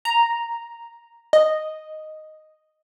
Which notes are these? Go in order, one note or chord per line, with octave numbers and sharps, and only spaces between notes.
A#5
D#5